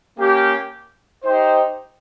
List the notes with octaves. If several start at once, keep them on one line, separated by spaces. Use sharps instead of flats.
A#3 C#4 G4
D#4 G4 C5